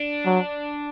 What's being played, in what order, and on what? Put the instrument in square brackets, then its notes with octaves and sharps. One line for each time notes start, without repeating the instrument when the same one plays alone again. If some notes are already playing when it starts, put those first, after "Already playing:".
Already playing: [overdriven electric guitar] D4
[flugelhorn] F#3